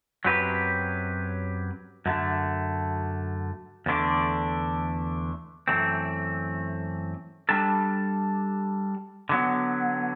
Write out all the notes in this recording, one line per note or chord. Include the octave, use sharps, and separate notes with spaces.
F#2 F#3 C4 G4 B4
F#2 D3 A3
E2 D3 A3 D4
F#2 E3 A3 C4
G3 D4 A4
D3 F#3 B3